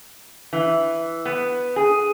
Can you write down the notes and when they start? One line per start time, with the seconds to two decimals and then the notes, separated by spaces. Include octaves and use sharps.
0.53 E3
1.25 B3
1.76 G#4